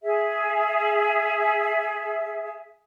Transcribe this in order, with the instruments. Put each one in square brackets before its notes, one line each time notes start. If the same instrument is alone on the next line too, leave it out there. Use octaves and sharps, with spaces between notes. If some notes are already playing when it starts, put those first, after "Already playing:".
[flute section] G#4 E5